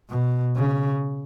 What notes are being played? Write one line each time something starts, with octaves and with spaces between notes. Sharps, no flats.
B2
C#3